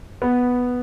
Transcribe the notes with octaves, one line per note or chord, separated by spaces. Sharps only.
B3